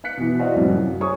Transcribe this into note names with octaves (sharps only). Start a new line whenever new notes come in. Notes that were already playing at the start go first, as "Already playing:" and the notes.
F5 F#6 B6 C#7
B2 E3
F#4 C5 D5 D#5 F5
C2 F2 A2
F#2
G#4 C5 C#5 C#6 D#6